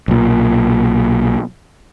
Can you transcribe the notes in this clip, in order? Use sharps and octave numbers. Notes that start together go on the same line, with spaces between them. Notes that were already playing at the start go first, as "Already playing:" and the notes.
B1 A#2